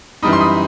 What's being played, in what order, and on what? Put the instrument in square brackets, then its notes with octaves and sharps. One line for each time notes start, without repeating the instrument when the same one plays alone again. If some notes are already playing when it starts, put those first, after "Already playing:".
[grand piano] F#2 E3 G3 D#4 B5 D#6
C6
B5 D#6